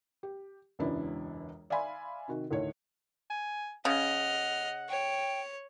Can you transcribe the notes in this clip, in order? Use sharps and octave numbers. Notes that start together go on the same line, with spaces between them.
G4
E1 C#2 F#2 B3 D4 E4
D5 E5 F5 G#5 B5 C6
C3 D#3 F#4
D2 A2 D#3 C#5
G#5
C#3 D#5 F#5 F6
C#5 G5